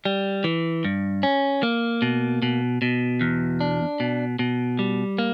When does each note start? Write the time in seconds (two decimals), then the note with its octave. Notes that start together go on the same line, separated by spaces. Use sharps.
0.05 G3
0.44 E3
0.85 G2
1.23 C#4
1.63 A#3
2.02 B2
2.42 B2
2.82 B2
3.21 E2
3.61 D4
4.00 B2
4.39 B2
4.79 G3
5.18 A#3